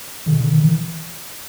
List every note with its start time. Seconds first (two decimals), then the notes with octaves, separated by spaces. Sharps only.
0.26 B2 D#3
0.39 D3
0.51 D#3
0.63 E3